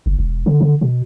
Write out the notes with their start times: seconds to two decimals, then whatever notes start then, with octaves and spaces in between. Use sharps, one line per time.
0.06 F#1
0.19 E1
0.46 D3
0.61 D3
0.81 B2